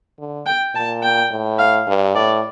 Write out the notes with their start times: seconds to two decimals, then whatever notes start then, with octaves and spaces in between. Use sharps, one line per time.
0.19 D3
0.46 G5
0.75 A#2 A5
1.03 G5
1.31 A2
1.59 F5
1.87 G2
2.15 A2 D5